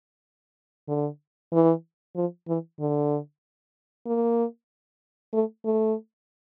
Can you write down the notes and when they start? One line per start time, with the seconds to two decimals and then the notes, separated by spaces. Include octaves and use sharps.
0.88 D3
1.53 E3
2.16 F3
2.48 E3
2.80 D3
4.06 A#3
5.34 A3
5.66 A3